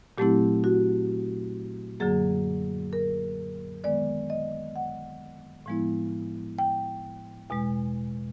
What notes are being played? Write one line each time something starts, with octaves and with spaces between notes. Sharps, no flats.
A#2 F#3 A3 C4 E4 G4
F#4
F#2 D3 F#3 A#3 G#4
A#4
D#3 G#3 B3 D5
D#5
F#5
A2 F3 G#3 B3 E4
G5
E2 B2 G#3